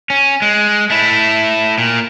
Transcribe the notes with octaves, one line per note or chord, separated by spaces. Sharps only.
C#4
G#3
A3 E4
A#2